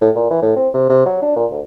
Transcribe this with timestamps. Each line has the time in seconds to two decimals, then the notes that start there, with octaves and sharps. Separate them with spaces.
0.01 A2
0.15 A#2
0.30 E3
0.42 A2
0.56 C4
0.74 C3
0.89 C3
1.06 F#3
1.22 D4
1.36 A#2
1.51 D2